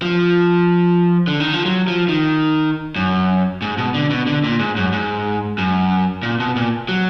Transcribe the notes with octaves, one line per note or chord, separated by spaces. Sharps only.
F3
D3
D#3
F3
F#3
F3
D#3
F#2
G#2
B2
D3
B2
D3
A#2
G#2
F#2
G#2
F#2
A#2
B2
A#2
F#3